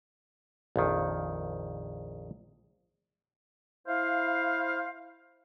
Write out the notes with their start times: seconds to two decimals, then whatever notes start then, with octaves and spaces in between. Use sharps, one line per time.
0.76 A#1 F2 D#3
3.87 E4 C5 F5